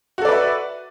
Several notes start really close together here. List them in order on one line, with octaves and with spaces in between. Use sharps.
F#4 A4 D5 B4 E5